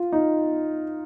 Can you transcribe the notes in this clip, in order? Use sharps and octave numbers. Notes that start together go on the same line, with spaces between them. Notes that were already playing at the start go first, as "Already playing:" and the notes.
Already playing: F4
D#4